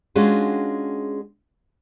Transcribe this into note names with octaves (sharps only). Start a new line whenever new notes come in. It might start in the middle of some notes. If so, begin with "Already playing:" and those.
G#3 C#4 D4 F4 F#4 G#4